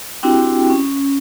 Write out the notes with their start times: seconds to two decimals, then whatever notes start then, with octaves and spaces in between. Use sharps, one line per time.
0.23 C4 D4 E4 F#4 G4 G5
0.70 C#4